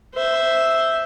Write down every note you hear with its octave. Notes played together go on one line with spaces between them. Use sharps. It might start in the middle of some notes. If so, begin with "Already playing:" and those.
C5 E5